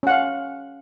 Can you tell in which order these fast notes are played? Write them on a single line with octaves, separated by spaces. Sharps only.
C#4 F#5 F5